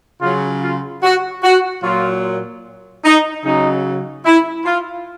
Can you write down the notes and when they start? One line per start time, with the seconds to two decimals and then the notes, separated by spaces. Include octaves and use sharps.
0.22 C#3 F#3 F4
0.62 F4
1.03 F#4
1.43 F#4
1.83 A#2 F#3 F4
3.05 D#4
3.45 C#3 F#3 D#4
4.26 E4
4.66 F4